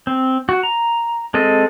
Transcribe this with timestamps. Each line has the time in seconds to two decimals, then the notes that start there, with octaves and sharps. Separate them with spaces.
0.07 C4
0.49 F#4
0.63 A#5
1.34 G#3 C4 A4 D#5